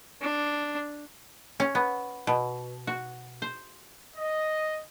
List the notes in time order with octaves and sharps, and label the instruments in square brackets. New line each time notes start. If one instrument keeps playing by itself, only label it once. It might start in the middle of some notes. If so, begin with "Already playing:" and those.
[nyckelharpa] D4
[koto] C#4
B3
B2
F#4
C5
[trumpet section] D#5